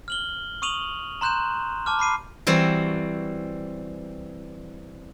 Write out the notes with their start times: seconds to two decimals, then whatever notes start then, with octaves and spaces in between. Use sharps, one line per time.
0.08 F6 F#7 G7
0.62 C#6 D#6 D#7 F7 F#7
1.21 A#5 C6 F#6 G6 E7
1.86 A5 D6 F6
1.99 B5 D6 C7 D#7
2.47 E3 G3 C4 F#4